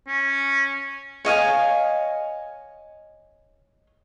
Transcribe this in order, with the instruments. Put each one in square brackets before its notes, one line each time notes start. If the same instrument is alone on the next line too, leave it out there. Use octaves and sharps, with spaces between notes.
[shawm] C#4
[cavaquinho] C#5 D#5 F5 G#5